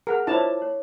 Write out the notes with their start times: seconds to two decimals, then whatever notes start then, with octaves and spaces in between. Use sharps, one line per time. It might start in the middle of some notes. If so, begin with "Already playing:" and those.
0.07 G#4 A#4 F#5 F#6
0.27 D4 E4 F4 C5 C#5 A5
0.62 C#5